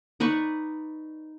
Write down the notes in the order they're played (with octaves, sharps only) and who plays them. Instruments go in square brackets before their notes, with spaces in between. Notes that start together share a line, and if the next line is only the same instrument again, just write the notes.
[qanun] D#4 B4 D5 C#6